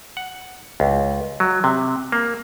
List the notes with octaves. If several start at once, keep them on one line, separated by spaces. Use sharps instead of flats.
F#5
C#2
F#3
C3
A#3